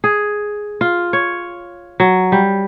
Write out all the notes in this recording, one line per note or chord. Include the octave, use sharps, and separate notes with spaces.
G#4
F4
C#5
F#3
G3